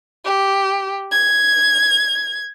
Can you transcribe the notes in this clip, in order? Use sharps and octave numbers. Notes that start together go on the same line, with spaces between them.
G4
G#6